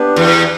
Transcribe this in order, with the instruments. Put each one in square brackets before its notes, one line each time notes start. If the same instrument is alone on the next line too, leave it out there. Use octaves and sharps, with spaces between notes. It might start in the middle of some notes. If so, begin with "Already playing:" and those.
Already playing: [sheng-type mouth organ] B3 D4 G4 B4
[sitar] E2